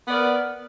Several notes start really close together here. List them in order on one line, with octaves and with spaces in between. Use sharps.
B3 D5 A#4